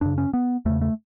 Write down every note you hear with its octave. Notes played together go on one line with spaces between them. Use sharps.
F#2 C#3 D4
C#4
B3
E2 C#3 A3
A3